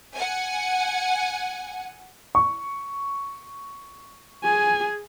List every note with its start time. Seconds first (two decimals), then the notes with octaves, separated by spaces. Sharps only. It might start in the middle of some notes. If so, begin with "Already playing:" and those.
0.14 F#5 G#5
2.35 C#6
4.44 G#4 G#5